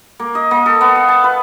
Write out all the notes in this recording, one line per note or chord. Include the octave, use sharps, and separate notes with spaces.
A#3
D#5
A#3
A4
B3
F5
A5
B4